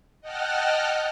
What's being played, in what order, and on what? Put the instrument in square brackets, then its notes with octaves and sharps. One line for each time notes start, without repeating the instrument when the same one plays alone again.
[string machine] D#5 F#5 G5 A5 F6 F#6